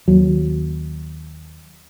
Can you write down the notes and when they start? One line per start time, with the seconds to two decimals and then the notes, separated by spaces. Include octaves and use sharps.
0.08 D#2 F#3